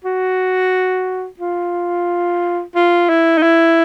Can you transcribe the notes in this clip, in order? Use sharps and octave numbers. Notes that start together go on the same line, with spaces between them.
F#4
F4
F4
E4
D#4
E4